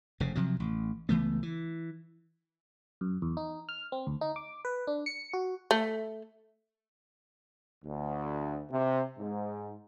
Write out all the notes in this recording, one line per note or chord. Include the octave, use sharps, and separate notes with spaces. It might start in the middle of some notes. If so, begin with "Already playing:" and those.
F1 C#3
C3 F3 F#3
A1
C#2 E3 A3 B3
E3
F#2
E2
D#4
F6
C4
D2
D#4
D6
B4
D4
C#7
F#4
A3
D2
C3
G#2